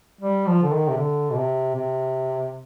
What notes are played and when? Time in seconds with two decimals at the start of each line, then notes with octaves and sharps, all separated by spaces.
0.21 G3
0.47 F3
0.63 D3
0.72 D#3
0.89 C3
0.98 D3
1.30 B2
1.37 C3
1.75 C3